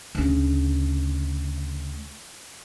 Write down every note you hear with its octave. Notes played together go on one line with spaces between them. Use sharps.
D2 C#3